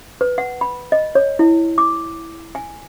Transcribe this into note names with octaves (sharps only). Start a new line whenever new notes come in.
B4
F#5
B5
D#5
C#5
E4
D6
G#5